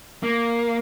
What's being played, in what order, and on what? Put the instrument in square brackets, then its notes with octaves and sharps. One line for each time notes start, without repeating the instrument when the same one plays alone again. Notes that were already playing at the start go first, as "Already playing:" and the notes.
[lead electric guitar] A#3